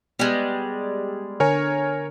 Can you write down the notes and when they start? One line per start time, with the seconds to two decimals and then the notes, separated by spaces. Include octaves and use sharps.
0.19 G3 G#3 B3
1.40 D3 A#4 C#5 G#5